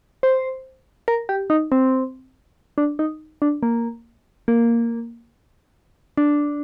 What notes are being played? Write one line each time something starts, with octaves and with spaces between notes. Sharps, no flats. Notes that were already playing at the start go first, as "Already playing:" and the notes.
C5
A#4
G4
D#4
C4
D4
D#4
D4
A#3
A#3
D4